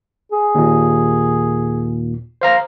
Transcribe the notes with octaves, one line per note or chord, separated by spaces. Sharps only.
G#4
D#2 A#2
C5 F5 A#5